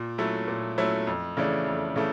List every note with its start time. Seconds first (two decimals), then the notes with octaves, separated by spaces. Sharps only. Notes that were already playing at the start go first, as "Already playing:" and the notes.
Already playing: A#2
0.18 F#3 A3 C#4 E4
0.48 A#2
0.78 F#3 A3 C#4 E4
1.07 F2
1.37 C#3 E3 A3 D4
1.66 F2
1.96 C#3 E3 A3